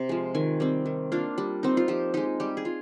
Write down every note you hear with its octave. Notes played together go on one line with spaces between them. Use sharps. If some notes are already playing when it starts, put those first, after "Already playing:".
Already playing: C3
F3 G#3
D#3 G#5
G3 C4
D#3
A#3 D4 F4
G3
C4 D#4
F4
F3 G4
G#3 D#4 G4
G3 G4
G#4
F4